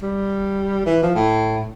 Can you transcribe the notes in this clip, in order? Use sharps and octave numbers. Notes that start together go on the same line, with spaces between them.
G3
E3
F3
A2